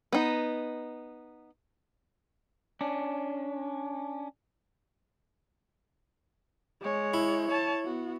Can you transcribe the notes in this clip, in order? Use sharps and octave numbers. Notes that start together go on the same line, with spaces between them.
B3 D#4
C#4 D4
G#3 C#5
E4
C#5 A5
B3 F#4